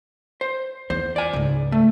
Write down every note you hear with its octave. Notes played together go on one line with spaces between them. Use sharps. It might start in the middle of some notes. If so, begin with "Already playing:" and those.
C5
E2 C5
D5 G#5
C#2 G#2
A3